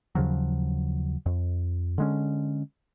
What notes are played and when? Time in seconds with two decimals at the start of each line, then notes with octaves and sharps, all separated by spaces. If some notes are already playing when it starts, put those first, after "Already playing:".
0.15 D#2 C#3 F3 F#3
1.26 F2
1.98 D3 G#3 C#4